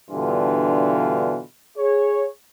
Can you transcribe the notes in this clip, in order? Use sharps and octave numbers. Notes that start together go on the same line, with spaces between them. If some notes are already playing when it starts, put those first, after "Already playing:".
G2 B2 D3 E3 F4
G#4 C#5